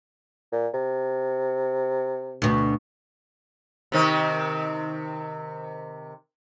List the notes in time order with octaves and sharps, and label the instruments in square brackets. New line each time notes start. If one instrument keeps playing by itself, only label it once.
[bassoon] A#2
C3
[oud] D2 B2
[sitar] C3 D#3 C4